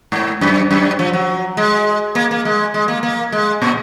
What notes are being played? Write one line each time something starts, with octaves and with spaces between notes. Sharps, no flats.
G#2
F#2
F#2
F3
F#3
G#3
A#3
A#3
G#3
G#3
A#3
A#3
G#3
A#2